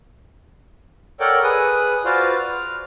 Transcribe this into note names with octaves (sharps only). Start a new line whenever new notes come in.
A4 A#4 C#5 D5 F#5 G5
G#4 B4 D#6
F4 F#4 B4 C5 D5 F5
F6